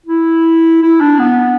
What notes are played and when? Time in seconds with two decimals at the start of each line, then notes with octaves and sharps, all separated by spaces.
0.06 E4
0.82 E4
1.00 D4
1.19 B3